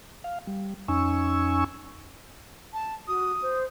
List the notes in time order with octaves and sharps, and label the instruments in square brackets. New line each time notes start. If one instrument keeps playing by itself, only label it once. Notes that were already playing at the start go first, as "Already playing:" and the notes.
[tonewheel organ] F5
G3
F2 C#4 D#4 G#5 C#6 E6
[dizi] A5
[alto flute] F#4 [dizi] D#6
[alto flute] C5